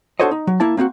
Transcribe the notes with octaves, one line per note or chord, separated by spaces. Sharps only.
D4 F#4 A4 C5 C#5 D#5
D#4
F#3
A#3 E4 A5
A#3 C4 D#4 F#4